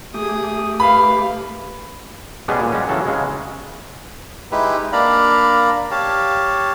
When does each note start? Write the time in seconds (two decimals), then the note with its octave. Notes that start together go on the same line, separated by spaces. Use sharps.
0.14 A3 G4 G#4 D#6
0.80 B4 F5 B5
2.48 B2 G3 G#3 B3 C#4 G#4
2.60 A#2
2.72 G3 G#3 C#4
2.89 C#3 E3 F#3 A4
3.07 C#3 G#3
4.52 G#3 D#4 E4 G4 B4
4.92 A#3 D4 D5 F5 A#5 B5
5.91 G4 C#5 F5 A5